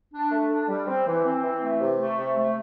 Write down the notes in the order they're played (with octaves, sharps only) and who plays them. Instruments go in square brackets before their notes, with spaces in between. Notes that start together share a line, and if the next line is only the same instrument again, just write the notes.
[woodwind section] D4
A3
D4
G3
C4
E3
C4
E3
A3
C3
A3
C3
A3